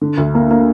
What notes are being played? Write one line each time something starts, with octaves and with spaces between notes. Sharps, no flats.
D3
D2
A#3
A#3